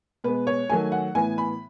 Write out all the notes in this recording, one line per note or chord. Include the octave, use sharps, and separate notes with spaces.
B2 G#3 B3 B4
C#5
D#3 F#3 A3 G#5
F#5
A2 E3 B3 G#5
B5